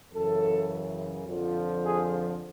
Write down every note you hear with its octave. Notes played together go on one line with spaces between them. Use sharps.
F#2 C#3 E3 A4
F2 D3 F3
G#4